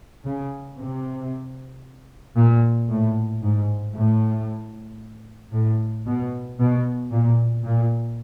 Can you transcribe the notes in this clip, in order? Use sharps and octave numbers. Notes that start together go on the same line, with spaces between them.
C#3
C3
A#2
A2
G#2
A2
A2
B2
B2
A#2
A#2